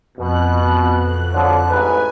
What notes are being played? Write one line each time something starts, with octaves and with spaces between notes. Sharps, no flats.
F2 B2 F#6
D3 F3 F#3
A1 G#2 B4 G#5